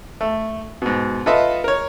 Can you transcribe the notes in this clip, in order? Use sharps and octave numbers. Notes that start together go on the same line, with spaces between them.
A3
G#2 B2
F4 A4 B4 D#5 E5
A#4 C#5